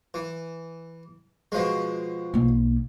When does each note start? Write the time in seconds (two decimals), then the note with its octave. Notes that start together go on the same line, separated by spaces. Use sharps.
0.14 E3
1.52 B2 F3 G#3
2.34 B1 A#3